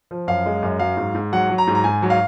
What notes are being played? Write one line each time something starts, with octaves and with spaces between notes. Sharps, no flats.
F3
F#2 F5
G#3
F#2
F#3 F5
G#2
G#2
F#3 F#5
F#3
A#5
G#2
A#5
G#2 G#5
F#3
F5